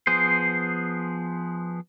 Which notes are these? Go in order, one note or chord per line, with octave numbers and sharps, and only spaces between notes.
F3 B3 G#4 C5